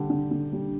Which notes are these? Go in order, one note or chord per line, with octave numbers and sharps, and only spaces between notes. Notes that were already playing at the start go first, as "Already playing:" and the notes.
Already playing: D3 G3 G4
D3
D3
G3